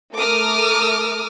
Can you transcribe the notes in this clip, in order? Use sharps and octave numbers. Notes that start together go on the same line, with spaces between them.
A3 A#4 D6 D#6 F6